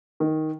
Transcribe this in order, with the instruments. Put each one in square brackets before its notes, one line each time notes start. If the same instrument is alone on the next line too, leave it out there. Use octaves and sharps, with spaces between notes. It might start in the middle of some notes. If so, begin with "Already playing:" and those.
[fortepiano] D#3